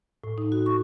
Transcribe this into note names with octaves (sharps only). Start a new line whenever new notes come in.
A2
D#4
F#4
C#6